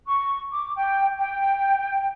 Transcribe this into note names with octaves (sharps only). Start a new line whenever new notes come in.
C#6
D6
G5
G5